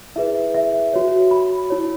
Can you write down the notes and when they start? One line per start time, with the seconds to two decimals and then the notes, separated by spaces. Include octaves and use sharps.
0.16 E4 G#4 B4 E5
0.54 E5
0.93 F#4 C#5
1.31 B5
1.70 E4 C#5